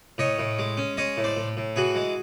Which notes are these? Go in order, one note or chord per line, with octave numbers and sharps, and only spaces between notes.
A2 C#5 D#5
A2
G#3
C#4
G#3 C#5 D#5
A2
C5 D5
A2
A2
E3 F#4 G#4
G#3